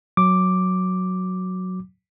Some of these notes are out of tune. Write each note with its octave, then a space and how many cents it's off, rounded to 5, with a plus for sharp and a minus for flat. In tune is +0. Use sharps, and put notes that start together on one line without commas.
F#3 -5 D6 +0